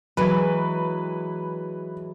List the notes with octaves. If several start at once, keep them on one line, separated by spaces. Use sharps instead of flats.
E3 F#3 G#3 B4